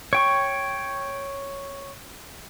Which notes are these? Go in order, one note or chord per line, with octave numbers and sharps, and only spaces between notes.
C#5 G5 C#6